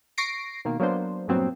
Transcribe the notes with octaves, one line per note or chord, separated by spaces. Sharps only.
C#6 A#6 C7 D7
B2 D#3 A#3
F#3 A#3 B3 D4 C5
G2 A#2 F#3 B3 C4